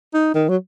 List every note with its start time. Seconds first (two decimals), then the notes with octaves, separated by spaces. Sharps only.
0.14 D#4
0.34 D#3
0.49 F#3